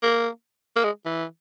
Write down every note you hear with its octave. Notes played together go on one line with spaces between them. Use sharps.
A#3
A#3
G#3
E3